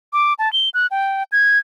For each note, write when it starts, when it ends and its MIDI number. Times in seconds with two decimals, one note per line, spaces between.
0.13 0.34 86
0.39 0.51 81
0.53 0.69 103
0.74 0.87 90
0.91 1.23 79
1.32 1.59 92